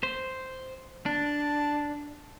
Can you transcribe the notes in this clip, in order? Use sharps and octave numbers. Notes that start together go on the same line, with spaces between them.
C5
D4 A5